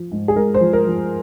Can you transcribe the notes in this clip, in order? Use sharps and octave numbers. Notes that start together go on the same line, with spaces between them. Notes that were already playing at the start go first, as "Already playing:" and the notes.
Already playing: F3
G#2
G#4
G#2 A#4
C5
F3
A#4
F3